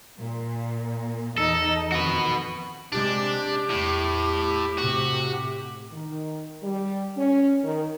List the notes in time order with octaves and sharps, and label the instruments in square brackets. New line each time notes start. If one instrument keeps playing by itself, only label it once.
[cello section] A#2
[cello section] E2 D#4 D#5 [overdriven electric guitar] A4
[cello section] F2 D#3 [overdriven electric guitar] F#4 B4
[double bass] C3 G#3 [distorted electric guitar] D4 [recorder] G4
[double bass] E2 [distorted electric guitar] A2
[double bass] A2 C3 [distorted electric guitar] F#4
[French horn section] D#3
G3
C#4
D#3